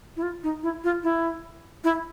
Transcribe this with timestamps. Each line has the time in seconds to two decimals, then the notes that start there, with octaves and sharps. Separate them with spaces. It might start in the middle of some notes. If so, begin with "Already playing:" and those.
0.17 E4
0.23 F4
0.44 D#4
0.63 E4
0.84 F4
1.03 E4
1.84 E4